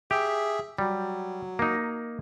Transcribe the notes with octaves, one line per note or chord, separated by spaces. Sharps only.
G4 G#4 E5
F#3 G3
A#3 D#4